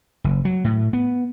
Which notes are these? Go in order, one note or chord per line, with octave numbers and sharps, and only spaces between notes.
F#1
F#3
A2
B3